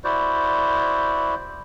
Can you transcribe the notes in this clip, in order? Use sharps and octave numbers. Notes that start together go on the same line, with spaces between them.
E4 F#4 C5 D5